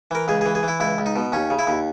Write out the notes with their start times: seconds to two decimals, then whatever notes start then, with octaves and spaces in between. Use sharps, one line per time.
0.11 E3 A#4
0.28 C#2 G#4
0.41 G#4
0.46 E3
0.55 G#4
0.63 E3 E4
0.80 C#2 E4
0.98 C#2
1.06 D#4
1.16 B2
1.32 D#2 C#4
1.50 C#3
1.59 E4
1.67 D#2